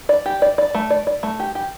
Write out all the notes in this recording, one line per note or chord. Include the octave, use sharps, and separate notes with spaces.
D5
G4
D5
D5
A3
D5
D5
A3
G4
G4